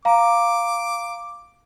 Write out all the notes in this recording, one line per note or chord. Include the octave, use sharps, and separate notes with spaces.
F5 A#5 D6